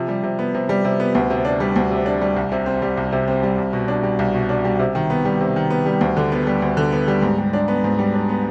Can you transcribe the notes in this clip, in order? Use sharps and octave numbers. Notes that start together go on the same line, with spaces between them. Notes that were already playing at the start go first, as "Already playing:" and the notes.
Already playing: C3 F3
G3
C3
B3
C3
G3
C3
B3
D2
C3
D4
G3
D2
C3
D4
G3
C2
C3
C4
G3
C2
C3
C4
G3
C2
B2
D4
G3
C2
B2
D4
G3
C3
D#3
B3
G3
C3
D#3
B3
G3
D2
D3
B3
G3
D2
D3
B3
G3
G#2
G3
D4
B3
G#2
G3
D4
B3